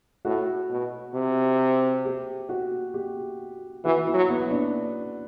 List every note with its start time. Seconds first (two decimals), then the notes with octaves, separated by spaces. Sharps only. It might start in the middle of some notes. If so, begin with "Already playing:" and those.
0.25 A2 F#4
0.70 B2
1.15 C3
2.05 G4
2.49 F#4
2.94 G4
3.85 E3 F#4
4.07 E4
4.14 F#3
4.29 B3
4.51 D4